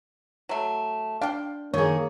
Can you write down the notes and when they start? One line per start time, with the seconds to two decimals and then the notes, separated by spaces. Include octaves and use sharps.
0.49 F#3 A3
1.21 D4 D5 F5 G5
1.74 D#3 A#3 G#4 C#5